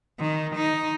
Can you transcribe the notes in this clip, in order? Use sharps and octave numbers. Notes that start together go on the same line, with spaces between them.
D#3
D#4